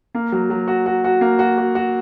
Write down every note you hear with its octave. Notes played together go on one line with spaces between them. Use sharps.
A#3
F#3
F#3
F#4
F#4
F#4
A#3
F#4
F#4
F#4